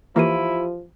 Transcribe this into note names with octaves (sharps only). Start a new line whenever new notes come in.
E3 F3 A#3 E4 F4 G4 D#7